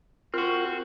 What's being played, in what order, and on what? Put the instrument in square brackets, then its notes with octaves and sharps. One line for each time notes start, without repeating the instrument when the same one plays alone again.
[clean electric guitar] C4 F#4 [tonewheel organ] F4 A#4